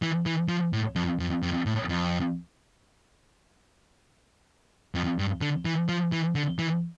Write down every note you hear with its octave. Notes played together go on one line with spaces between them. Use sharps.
E3
E3
F3
A2
F2
F2
F2
A2
F2
F2
G2
D3
E3
F3
E3
D3
E3